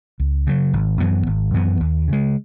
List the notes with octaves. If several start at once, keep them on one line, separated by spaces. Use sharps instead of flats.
C#2
C#3 F#3
G#1
F#2 E3 B3
G#1
F#2 E3 B3
D#2
C#3 G#3